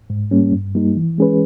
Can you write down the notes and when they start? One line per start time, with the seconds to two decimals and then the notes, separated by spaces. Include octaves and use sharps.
0.10 G#2
0.31 G3 A#3 C#4
0.53 G2
0.75 G3 A#3 D#4
0.96 E3
1.18 G#3 C#4 G#4 B4